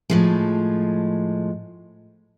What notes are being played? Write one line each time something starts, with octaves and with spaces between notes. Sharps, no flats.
A2 F3 G#3